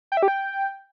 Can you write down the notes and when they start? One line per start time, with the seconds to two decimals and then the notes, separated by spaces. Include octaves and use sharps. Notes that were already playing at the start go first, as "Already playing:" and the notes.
0.12 G5
0.17 E5
0.23 G4
0.28 G5